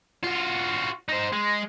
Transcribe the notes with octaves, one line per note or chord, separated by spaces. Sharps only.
F4 F#4
D#4 C5
G#3